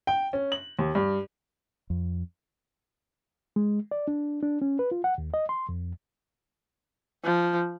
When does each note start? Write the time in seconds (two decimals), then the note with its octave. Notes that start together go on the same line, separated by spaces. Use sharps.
0.07 G5
0.33 C#4
0.52 F#7
0.79 D#2
0.95 G2
1.90 F2
3.56 G#3
3.91 D5
4.08 D4
4.43 D4
4.62 C#4
4.79 B4
4.91 F4
5.04 F#5
5.18 D#2
5.34 D#5
5.49 C6
5.69 F2
7.24 F3